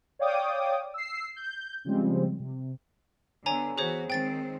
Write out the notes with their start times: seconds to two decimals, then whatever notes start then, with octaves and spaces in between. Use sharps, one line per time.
0.19 C#5 D5 F5 G5 D6 D#6
0.94 E6 C7
1.36 G6
1.85 C#3 F3 G3 G#3 C4
2.40 C3
3.46 D3 B3 C#5 G#5 A#5
3.78 E3 B3 F#4 G#4 C5 C#5
4.10 D#3 G#3 C4 G5 A6 D7